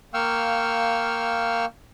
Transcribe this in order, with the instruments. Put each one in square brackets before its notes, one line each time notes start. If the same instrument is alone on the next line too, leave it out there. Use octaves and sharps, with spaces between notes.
[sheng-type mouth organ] A#3 F5 G5 C#6 E6 F6